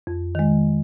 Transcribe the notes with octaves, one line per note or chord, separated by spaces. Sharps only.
F2
D#3 G#3